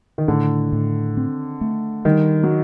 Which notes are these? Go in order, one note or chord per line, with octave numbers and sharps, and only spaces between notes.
D#3
A2 D3
A2
C4
A3
D#3 G3
F#3